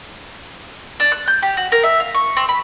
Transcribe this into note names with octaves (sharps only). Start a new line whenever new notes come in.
D4
F#6
G6
G4
F#4
A#4
E5
F5
C#6
C4
B5